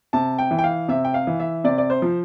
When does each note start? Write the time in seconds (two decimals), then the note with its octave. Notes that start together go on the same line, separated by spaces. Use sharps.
0.13 C3 A5
0.39 G5
0.51 E3
0.59 G5
0.64 F5
0.88 C3 E5
1.05 G5
1.14 F5
1.27 E3
1.40 E5
1.64 C3 D5
1.78 D5
1.90 C5
2.02 F3